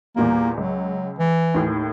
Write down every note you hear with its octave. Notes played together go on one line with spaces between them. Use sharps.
E2 A#2 G3 A#3
C#2 F#3
E3
D#2 A2